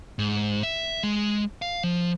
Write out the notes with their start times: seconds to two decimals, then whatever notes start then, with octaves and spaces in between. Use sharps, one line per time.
0.19 G#2
0.63 E5
1.03 G#3
1.62 F5
1.84 F3